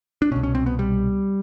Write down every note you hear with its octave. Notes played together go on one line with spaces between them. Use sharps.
D4
C2 B2 C#4
C#4
C4
B3
G3